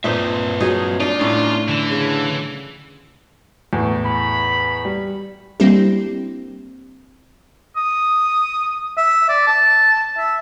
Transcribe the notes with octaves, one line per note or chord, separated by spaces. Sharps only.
A#2 C4 D#4 B4 C5 E5
F#3 D#4 G#4
D4 D#4 F4
A2 C#4 D#4 F4
D3 E3
C#3
E2 A2
B5
G3
G3 A#3 C4 D4 E4 G4
D#6
E5
D5
A5
E5